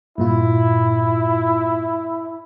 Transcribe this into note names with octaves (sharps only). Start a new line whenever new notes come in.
G2 A#2 E4 F4